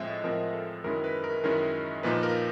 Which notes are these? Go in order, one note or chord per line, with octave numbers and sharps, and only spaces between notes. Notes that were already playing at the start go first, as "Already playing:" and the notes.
Already playing: A2 F3 G#3 C4 D#5 E5
A2 F3 G#3 C4 A#4
A4
F#2 D#3 G#3 C#4 E4 A#4
B4
A#4
F#2 D#3 G#3 C#4 E4 A#4
A#2 F3 A#3 D#4 B4
A#4